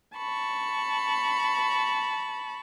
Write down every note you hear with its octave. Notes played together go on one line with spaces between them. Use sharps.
A5 B5 C#6